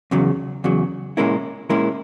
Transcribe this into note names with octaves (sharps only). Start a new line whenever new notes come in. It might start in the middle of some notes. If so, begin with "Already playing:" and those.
E2 C#3 F#3
E2 C#3 F#3
A#2 G#3 C#4 E4 A#4
A#2 G#3 C#4 E4 A#4